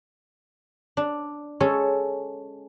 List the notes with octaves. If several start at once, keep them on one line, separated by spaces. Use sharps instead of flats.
D4
G#3 C#4 A4 C#5